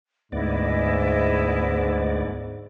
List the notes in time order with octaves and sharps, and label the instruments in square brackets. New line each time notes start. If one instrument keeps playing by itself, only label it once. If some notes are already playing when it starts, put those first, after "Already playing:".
[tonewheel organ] D2 B3 D5 [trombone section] G#2 [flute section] E4 D#5